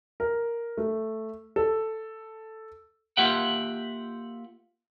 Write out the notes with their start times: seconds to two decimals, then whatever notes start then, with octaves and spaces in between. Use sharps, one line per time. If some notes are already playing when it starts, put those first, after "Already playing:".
0.20 A#4
0.78 A3
1.56 A4
3.17 A#3 F4 G4 E5 F#5 G5